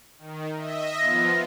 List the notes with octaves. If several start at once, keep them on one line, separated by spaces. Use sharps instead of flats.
D#3
D#5 E5
F3 B3 F4 A#6